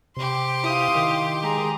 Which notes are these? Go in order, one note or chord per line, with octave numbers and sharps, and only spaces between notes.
C3 G4 C6
E4 F5 D#6
D#3
G#3 G#4 A#5